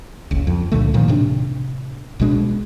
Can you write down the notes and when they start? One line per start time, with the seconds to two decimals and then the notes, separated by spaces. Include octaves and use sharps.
0.31 F#1 C#2
0.47 F2
0.72 C#2 A#2 D3 A3
0.94 A#2 D#3 F3
1.08 A2 C3 D4
2.20 B1 B2 G#3 D4